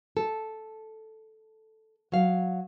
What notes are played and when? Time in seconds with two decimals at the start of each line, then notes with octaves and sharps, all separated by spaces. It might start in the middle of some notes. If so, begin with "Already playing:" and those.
0.17 A4
2.12 F#3 F5